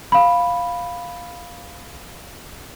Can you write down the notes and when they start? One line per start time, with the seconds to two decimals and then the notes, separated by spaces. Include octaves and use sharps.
0.12 F5 B5